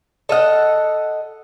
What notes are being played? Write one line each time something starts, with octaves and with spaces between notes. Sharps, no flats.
A4 D#5 F5 F#5